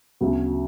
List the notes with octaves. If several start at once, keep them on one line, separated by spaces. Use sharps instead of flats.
D2 C#3 F#3 B3